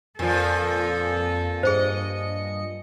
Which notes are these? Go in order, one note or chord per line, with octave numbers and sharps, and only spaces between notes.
F2 A#2 F3 A4
G2 G#4 C5 D#5 C#7